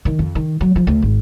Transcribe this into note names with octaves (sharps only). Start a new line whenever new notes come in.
D#3
F2
D#3
F#3
F3
D2
G#1